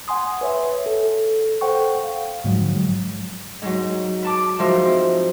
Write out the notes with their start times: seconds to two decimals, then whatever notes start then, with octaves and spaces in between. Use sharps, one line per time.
0.08 F#5 G#5 C6 D#6
0.41 B4 C#5 E5
0.86 A4
1.61 A4 C5 F#5 G5 C#6
2.04 F5
2.44 G#2 D3 F3 F#3 G#3
3.62 G#2 F#3
4.22 B4 A5 D6
4.59 G#2 F3 F#4 A#4 C5 E5
4.86 C4